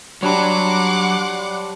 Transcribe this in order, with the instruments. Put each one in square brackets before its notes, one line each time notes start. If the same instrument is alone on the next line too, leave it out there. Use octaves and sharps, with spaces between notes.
[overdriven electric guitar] F#3 [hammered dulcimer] G3 D4 C#5 [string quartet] F#5 C6 D6